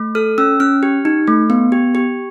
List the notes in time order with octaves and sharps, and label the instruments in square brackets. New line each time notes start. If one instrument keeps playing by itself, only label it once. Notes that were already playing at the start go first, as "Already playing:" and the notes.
Already playing: [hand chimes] A3
A4 F6
C#4 E6
C#4 F6
G4
D#4
A3
B3
G4
G4